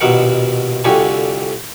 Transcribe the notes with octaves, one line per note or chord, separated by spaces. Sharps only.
A#1 D#2 B2 A#4 F#5
C2 F2 D3 F#4 G4 G#5